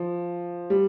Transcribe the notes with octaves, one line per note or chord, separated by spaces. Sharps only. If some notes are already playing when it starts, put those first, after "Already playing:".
Already playing: F3
G3